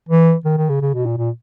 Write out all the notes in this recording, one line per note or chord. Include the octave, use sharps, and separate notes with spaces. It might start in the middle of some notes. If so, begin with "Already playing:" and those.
E3
D#3
D#3
C#3
C#3
B2
A#2
A#2